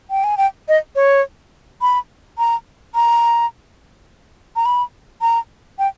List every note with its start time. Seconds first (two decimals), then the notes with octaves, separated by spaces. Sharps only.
0.10 G5
0.24 G#5
0.37 G5
0.68 D#5
0.96 C#5
1.81 B5
2.38 A#5
2.95 A#5
4.56 A#5
4.66 B5
5.22 A#5
5.79 G5